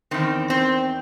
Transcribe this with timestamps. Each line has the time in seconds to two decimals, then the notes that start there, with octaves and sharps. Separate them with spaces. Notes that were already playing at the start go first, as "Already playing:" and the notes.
0.11 E2 D#3 C4
0.50 C4